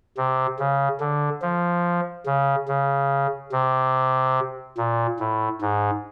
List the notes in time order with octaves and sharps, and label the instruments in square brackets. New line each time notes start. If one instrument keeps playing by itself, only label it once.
[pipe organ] C3
C#3
D3
F3
C#3
C#3
C3
A#2
A2
G#2